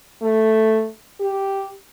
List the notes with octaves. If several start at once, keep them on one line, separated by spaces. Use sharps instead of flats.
A3
G4